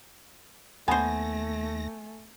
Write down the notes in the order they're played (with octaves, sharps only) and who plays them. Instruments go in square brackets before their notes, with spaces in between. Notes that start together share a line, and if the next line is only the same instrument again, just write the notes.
[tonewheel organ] D#2 A#6 [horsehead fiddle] A3 [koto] B3 C5 [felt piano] G#5